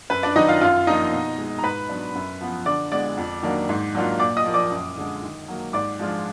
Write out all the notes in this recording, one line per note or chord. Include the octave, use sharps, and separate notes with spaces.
F#2 B4
D4 D5
D#3 F#3 D#4 D#5
F4 F5
F#2 F4 F5
F3 A#3 D4 D#4 F4 D#5
B2
G#3 D#4
A#5
G#2 B4 B5
F#3 B3 D4
F#2
F3 B3
D3 D5 D6
G#3 B3 D5 D6
F2
D#3 F#3 A#3 D4
G#2
F#3 A#3 D4 F4
A#2 D5 D6
D#5 D#6
F3 A#3
D5 D6
F#2
D3 G#3
D#3
F#3 A#3
G#2 D5 D6
F3 G#3 D4 F4